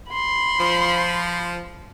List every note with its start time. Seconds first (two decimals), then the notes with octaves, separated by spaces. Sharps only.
0.11 B5 C6
0.59 F3